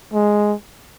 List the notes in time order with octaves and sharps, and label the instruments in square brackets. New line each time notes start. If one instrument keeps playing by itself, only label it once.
[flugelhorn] G#3